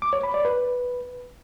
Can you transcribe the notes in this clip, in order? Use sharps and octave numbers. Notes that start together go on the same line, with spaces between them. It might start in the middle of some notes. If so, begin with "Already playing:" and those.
D6
C#5
B5
D5
B4